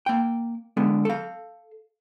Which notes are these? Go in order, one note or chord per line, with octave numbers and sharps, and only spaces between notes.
A#3 G5
D3 G#3 B3
A4 F5